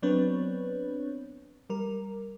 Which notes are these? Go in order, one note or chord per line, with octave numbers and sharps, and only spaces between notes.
F#3 B3 C4 D4 B4 C#5
G3 A#4